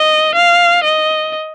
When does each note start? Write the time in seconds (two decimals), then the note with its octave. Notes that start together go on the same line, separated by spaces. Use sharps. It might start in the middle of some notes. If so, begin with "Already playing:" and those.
Already playing: D#5
0.34 F5
0.83 D#5